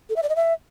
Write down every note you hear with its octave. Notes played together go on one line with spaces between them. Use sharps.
A4
E5
D5
D#5
E5